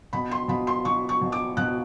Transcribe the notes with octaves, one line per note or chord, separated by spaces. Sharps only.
B2 B5
C6
B2 B5
C6
B2 C#6
C#6
B2
D6
B2 F#6